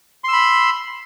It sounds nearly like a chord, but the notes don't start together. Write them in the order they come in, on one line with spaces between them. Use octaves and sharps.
C6 E6 B5